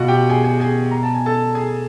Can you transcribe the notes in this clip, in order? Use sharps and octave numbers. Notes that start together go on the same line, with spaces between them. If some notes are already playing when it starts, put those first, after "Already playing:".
Already playing: B2 F4 F#4 F#5
G4 G5
G#4 G#5
G#4 G#5
G#4 G#5
A#5
A5
G#5
A4 A5
G#4 G#5